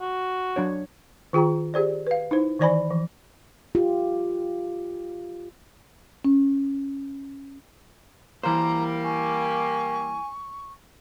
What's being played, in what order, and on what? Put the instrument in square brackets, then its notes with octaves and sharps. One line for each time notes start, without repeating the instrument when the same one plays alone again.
[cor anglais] F#4
[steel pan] F#3 D4 C#5
[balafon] D#3 F4 G#4 G5 A#5
G4 G#4 C5 D5
B4 F5
D#4 E4 C5
D#3 E3 C5 D5 G#5 B5
E3 F3
[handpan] F4 G4
[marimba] C#4
[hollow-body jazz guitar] E3 C5 [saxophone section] G3 A#3 [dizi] A#5
[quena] G#5 [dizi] C#6